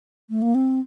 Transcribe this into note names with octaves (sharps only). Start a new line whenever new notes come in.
A3
A#3
C4